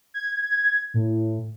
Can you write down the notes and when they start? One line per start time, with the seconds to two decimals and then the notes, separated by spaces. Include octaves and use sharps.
0.14 G#6
0.94 A2